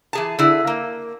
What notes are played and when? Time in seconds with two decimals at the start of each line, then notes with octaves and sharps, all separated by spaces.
0.13 E3 G#4 A5
0.39 D3 E4 G#4
0.67 A#3